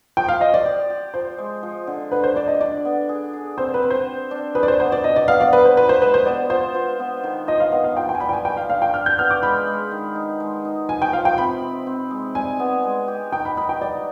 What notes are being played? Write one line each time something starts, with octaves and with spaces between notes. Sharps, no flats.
F3 G5
F5
F3 D#5
D5
G4
G4
F3 C5
G#3
F3
D3
D3 B4
C5
D4 D5
D#5
D4 D5
B3
G#4
G#4
C4 C5
B4
C4
C5
G4
D4
G#4 B4
D5
C5
B3 C5
D5
B2 D#5
D5
B3 F5
D5
G3 B4
C5
F4 B4
C5
G#3 B4
C5
B3 D5
F4 C5
F4
B3
D#3
F3 D#5
F5
B3 D#5
F5
F4 G5
G5
G#5
G3 B5
G5
G#5
G4 G5
F5
D4 F5
G5
G4 F6
G6
B3 F6
D6
G#3 B5
G#3
D#3
D#4
G#3
D#4
F3 G#5
G5
F3 F5
G5
C3 B5
C4
C4
G#3
G3 G#5
B3
G#3
G4
D#4 G5
B5
D#4 B5
G5
G3 D5